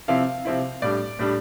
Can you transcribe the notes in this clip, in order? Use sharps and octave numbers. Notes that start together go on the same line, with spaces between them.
C3 F3 C4 E4 F5
C3 F3 C4 E4
A2 G3 D4 D5
A2 G3 D4